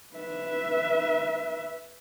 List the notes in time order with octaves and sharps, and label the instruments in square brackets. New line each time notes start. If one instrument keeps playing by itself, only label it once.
[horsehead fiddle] B4 E5